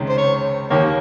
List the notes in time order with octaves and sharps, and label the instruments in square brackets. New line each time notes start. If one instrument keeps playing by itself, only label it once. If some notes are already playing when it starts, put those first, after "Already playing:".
Already playing: [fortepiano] C#2 C3 D#3
[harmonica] C5
C#5
[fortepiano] D#2 D#3 A#3 [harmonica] C#5